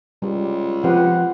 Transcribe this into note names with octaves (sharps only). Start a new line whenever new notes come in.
C#2 G3
F3 C4 G4 B4 F#5